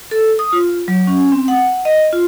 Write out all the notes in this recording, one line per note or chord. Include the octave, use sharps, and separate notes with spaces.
A4
D#6
F4
F#3
C#4
C4
F#5
D#5
F4